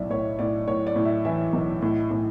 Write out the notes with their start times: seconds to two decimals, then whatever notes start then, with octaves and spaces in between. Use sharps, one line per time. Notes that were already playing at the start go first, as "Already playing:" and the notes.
Already playing: B1 A2 D5 E5
0.10 A2 C#5
0.39 A2 D5
0.67 A2 C#5
0.87 D5
0.96 A2
1.05 E5
1.25 E3 E5
1.53 B1
1.82 A2
2.11 A2